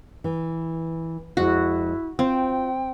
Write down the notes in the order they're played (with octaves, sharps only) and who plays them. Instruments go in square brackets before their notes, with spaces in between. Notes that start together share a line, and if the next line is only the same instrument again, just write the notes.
[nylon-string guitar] E3
[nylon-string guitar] F2 G#3 [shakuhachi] E4 [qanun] F#4
[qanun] C4 [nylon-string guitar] F4 [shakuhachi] G5